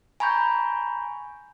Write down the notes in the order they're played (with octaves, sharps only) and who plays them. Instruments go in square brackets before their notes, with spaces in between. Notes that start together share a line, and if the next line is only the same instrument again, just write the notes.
[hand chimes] G#5 A#5 B5 C#6 G6